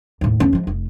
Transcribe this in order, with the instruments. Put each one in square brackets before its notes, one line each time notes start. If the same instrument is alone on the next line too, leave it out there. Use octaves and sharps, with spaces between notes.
[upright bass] D#2 A2
E2 C#4
F3 G#3
F1